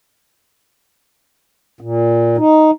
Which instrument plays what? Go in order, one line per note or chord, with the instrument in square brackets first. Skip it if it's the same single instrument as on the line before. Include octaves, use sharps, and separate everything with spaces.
[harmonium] A#2
D#4